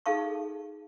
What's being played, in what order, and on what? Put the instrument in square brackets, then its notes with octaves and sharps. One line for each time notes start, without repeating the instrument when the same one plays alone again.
[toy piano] D#4 G#4 A4 F5 A5 C#6